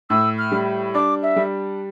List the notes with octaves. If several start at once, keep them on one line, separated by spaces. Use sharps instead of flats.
A2 E6
F6
G3
D4 D6
E5
G3